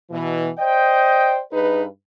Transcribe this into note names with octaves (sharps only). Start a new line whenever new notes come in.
B2 E3
C5 D5 D#5 G5
G2 D#4 G#4 B4